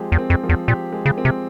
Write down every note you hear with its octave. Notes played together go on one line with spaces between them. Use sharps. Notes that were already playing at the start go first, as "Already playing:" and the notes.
Already playing: F3 G#3 C4 G4
E2
C4
F2
F3
E2
A#2 G4
G#3
C#3
C4
C3